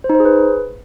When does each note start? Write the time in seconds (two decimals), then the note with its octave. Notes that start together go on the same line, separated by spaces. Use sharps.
0.04 C5
0.10 D#4
0.15 C5
0.20 G#4
0.25 B4